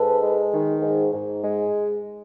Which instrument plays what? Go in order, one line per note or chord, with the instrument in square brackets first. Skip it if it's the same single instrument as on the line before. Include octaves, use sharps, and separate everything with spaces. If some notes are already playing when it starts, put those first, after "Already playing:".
Already playing: [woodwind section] G#2 A4 B4
G#3
D#3
G#2
G#2
G#3